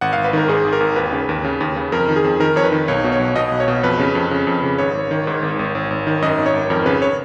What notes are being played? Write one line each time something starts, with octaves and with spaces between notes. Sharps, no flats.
G#1 F#5
G#1 F5
B4
D#3 A#4
G#2 G#4
G#1
A#4
G#1
D#2 B4
C#3
D#2
C#3
D#2
C#3
F2 A#4
D#3
G#4
F2
D#3 A#4
F2 C#5
B4
D#3
B1 C#5
B2
C#5
B1
B2 D#5
B1
C#5
B2
F2 B4
C#3
F2
C#3
F2
C#3
G#1 C#5
G#1
D#3
G#2
G#1
G#1
G#1
G#1
D#3
F#2 D#5
G#1
C#5
G#1
F2 A#4
C#3 B4
C#5